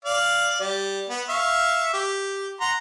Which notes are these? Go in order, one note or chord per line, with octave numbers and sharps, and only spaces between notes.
D5 F5
G3
B3
E5 F5 C#6
G4
F#5 A#5 C6